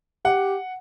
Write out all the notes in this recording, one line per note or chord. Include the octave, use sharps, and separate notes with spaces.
G4 F#5